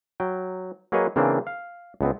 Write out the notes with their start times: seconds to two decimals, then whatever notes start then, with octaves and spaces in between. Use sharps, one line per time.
0.20 F#3 G5
0.92 F#3 A#3 G#4 B4 C#5 D#5
1.16 C#3 E3 A#3 C4 D4
1.47 F5
2.01 C#2 B3 C4